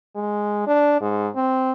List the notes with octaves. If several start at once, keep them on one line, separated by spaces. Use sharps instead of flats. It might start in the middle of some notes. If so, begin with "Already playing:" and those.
G#3
D4
G#2
C4